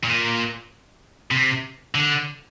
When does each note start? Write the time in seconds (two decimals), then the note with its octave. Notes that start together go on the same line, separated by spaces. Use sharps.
0.04 A#2
1.31 C3
1.95 D3